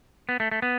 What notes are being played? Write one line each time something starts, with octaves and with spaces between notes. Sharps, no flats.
B3
A3
A3
B3